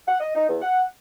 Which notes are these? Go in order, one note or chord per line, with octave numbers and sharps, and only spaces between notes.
F#5
D#5
D#4
E2
F#5